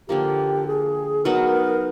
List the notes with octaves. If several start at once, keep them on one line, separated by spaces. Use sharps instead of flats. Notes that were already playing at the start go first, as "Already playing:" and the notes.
D3 F3 A#3 G4
G#4
F#3 B3 D#4 F#4 A#4